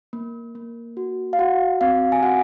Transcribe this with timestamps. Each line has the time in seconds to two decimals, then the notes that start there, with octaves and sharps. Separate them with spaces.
0.13 A#3
0.55 A#3
0.97 F#4
1.33 F5
1.39 F#4 F#5
1.81 C4 F5
2.12 G#5
2.23 F#4 F#5